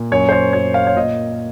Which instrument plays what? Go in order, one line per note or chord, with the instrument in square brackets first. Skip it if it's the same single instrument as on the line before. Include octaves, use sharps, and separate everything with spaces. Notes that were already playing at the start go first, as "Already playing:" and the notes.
Already playing: [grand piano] A#2
F#2 C#5
C5
C#5
F#2 C#5
F5
C#5
A#2 D#5